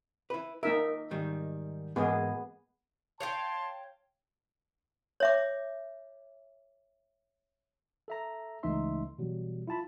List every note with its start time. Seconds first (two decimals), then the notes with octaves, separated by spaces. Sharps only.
0.30 E4 B4
0.63 A#3 D#4 A#4 E5
1.11 G#2 D#3 G3
1.96 G#2 E3 G#3 A#3 B3 G#4
3.20 C#5 F5 G5 A5 C6
5.20 C#5 E5 D6
8.08 A4 E5 A#5
8.63 C#2 E3 A3 D#4 E5 C6
9.19 B2 E3 F#3 G3
9.67 E4 F4 A5 B5